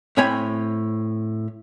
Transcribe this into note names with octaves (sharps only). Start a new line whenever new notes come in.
A2 C4 C#5 G#5 B5